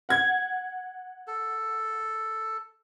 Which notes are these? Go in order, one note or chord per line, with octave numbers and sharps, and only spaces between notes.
F#5 G#6
A4